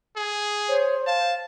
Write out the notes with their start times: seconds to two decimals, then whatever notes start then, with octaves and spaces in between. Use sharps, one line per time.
0.16 G#4
0.69 C5 C#5
1.07 F5 A5